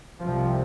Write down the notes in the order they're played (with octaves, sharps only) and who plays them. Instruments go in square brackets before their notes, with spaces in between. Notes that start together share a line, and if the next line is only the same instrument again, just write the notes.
[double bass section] C2 C3 F3